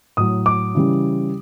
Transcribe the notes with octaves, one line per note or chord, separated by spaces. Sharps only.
A2 F#3 D#6
D6
C#3 E3 G3